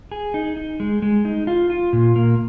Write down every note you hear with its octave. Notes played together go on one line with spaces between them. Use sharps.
G#4
D#4
D#4
G#3
G#3
D#4
F4
F4
A#2
A#3